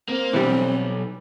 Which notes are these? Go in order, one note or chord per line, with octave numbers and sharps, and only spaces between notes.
A#3 C4
B1 E3 G3